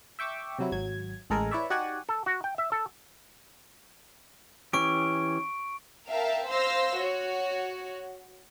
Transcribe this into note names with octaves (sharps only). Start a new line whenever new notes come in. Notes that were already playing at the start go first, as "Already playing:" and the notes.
E5 G5 C#6 D6 E6
C3 F#3 E4
G#1 F#3 G#6
A1 G#3 A4 A#4 G#5
E4 B4 C#5 D5 E5
D#4 F#4 G4 D5 F#5 G#5
A4
F#4
G5
E5
A4
E3 C#4 G4 C#6 D7
A#4 E5 F5 G5 A5
C5 F5 C6 E6 A#6
F#4 C#5